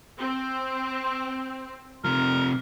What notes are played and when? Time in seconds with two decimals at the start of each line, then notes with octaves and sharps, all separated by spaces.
0.18 C4
2.04 C3 F3 A#4